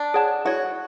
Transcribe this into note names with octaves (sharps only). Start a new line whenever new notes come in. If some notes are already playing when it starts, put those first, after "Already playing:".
Already playing: D4
G#4 C#5 F#5 A5
E4 F#4 G#4 C#5